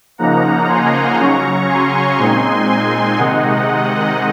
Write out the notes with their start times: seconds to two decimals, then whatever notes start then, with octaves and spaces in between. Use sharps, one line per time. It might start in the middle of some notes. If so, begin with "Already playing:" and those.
0.18 C#3 F3 A#3 D#4 F#5 A#5
0.68 G#5 C6
1.18 C#3 F#3 C#4 A#5 C#6
1.68 G#5 C6
2.18 A#2 G#3 C4 D#4 G#5 C6
2.68 G#5 C6
3.18 C3 D#3 G#3 D#4 D#5 F#5